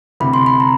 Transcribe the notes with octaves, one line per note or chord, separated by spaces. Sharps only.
D2 C3 E3 B5
C6
B5
A#5